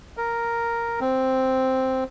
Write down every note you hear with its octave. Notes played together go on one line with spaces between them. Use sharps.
A#4
C4